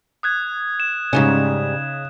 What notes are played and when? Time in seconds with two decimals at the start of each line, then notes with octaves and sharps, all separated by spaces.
0.23 D#6 F#6 G#6
0.80 E7
1.13 G#2 C#3 G3 C#4 D#4